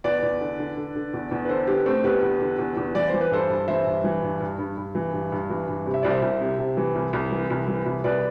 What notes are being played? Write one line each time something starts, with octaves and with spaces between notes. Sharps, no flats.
E2 B4 D5
E2
D3
D3
D3
D3
E2
E2
B4
D3 A4 C5
D3 G4 B4
D3 A3 C4
E2 G4 B4
E2
D3
E2
E2
E3 D5
C5
E3
B4
G2 A4 C5
G2
E3 C5 E5
G2
E3
G2
G2
G2
G2
E3
G2
G2
E3
G2
C3
E5
C2 D5
C5 E5
C2
C3
C3
E3
C2
C2
E3
C2
E3
C2
C2 B4 D5